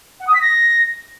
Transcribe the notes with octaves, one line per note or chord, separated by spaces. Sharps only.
F#5
D#6
B6
A#6